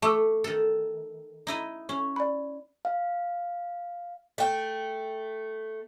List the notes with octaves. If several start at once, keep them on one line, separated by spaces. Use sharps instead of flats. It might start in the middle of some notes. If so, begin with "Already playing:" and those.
A3 A5 D6 E6
D#3 A4
D#4 E4 D#5
C#4
D5 B5
F5
A3 G5